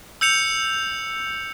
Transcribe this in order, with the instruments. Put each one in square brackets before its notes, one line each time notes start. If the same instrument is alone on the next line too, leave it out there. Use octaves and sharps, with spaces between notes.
[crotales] E6 G6 C#7 F7